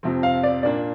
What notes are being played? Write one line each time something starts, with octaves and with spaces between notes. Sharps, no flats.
F2 C3 F3 C4
F5
D5
A#2 A#3 D4 D5